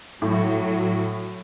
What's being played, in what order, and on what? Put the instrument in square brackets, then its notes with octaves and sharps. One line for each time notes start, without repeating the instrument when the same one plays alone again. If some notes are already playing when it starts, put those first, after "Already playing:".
[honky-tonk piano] A2 [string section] F#3